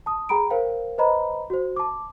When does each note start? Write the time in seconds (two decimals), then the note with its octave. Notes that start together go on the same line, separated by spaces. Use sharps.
0.06 A5 D#6
0.29 G#4 G5 A#5 B5 D7
0.50 A#4 C5 F5 G5
0.98 B4 C5 D#5 A#5 B5
1.50 F#4 C5
1.76 A5 D6